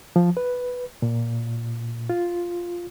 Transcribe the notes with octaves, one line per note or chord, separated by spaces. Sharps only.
F3
B4
A#2
F4